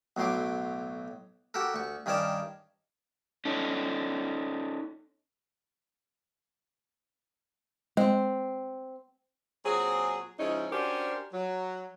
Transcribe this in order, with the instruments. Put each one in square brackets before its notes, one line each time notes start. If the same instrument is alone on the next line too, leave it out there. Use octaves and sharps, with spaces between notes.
[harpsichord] B1 A2 F#3 C6 D6
F#4 G4 A4 A#4
D2 C#6
G2 D#3 C#4 A#4 D5 A5
[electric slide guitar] C#4 D#4 A4
[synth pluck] G#3 [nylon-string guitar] C4
[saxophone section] A#2 F#3 C4 G#4
C#3 F3 G#3 C#4 D#4 E4
C#4 D4 F#4 G4 A#4 C5
F#3